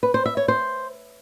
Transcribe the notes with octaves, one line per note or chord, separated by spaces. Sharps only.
B4
C5
E5
C#5
C5